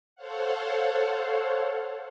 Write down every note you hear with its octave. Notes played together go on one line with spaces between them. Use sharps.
A4 C5 C#5 F5 F#5